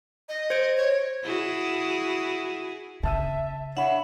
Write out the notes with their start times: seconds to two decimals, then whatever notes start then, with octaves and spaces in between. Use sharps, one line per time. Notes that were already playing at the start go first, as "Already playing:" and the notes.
0.29 D#5
0.50 C5 G#6 D7
0.77 C#5
1.23 E4 F#4 G#4
3.03 C#3 E5 A5 E6 D#7
3.77 D4 C#5 E5 F#5 B5